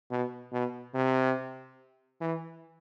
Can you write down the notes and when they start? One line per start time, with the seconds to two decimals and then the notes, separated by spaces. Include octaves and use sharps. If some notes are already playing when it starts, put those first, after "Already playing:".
0.11 B2
0.52 B2
0.94 C3
2.21 E3